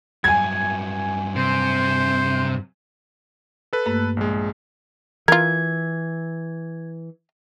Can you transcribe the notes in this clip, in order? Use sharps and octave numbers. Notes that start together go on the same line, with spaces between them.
G2 F#3 G#5 G#6
C3 C5
A4 B4
G2 A3 A#3
A#1 G#3
E3 F4 A#4 G#6